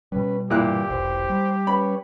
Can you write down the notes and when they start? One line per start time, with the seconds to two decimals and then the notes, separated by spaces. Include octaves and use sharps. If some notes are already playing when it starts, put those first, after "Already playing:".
0.12 B2 G3 C#4 B4
0.50 G2 A#2 E3 E4 G4 F#6
0.90 E1 B1 C5
1.29 G3
1.67 C#4 B4 C#5 B5